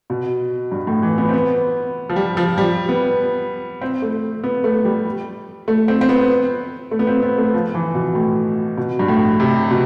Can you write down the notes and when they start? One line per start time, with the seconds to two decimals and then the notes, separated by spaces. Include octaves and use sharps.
0.10 B2
0.71 G2
0.87 A2
1.02 E3
1.18 B3
1.29 C4
1.34 B3
2.09 F3
2.16 G3
2.37 F3
2.58 G3
2.89 B3
3.81 C4
4.02 A3
4.44 B3
4.64 A3
4.85 G3
5.68 A3
5.88 C4
6.01 C4
6.09 B3
6.91 A3
6.99 B3
7.07 C4
7.23 B3
7.38 A3
7.54 F3
7.74 E3
7.95 B2
8.15 A2
8.77 B2
8.99 G2
9.09 A2
9.40 C3
9.71 B2